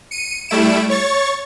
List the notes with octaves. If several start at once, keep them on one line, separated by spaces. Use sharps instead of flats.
C#7 D#7
G3 A3 E4 D7 E7
C#5 C#6 A6